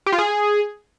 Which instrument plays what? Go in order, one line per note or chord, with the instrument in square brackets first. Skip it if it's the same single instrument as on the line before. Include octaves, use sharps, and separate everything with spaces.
[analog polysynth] G4
F4
G#4